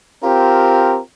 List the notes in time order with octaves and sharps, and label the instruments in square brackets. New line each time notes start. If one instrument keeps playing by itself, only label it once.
[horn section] C4 F4 G4 A#4